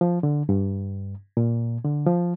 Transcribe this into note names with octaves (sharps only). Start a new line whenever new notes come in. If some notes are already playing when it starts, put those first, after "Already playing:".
F3
D3
G2
A#2
D3
F3